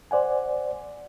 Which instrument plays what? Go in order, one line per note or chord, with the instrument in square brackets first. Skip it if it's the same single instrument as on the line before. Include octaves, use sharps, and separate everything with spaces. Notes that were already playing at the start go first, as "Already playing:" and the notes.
[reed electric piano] C5 D5 F#5 G#5